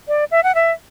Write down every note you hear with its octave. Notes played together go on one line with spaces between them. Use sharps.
D5
E5
F#5
E5